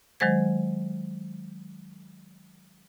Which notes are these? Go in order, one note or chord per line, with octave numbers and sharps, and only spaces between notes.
D#3 F#3 G#3 C5 G#6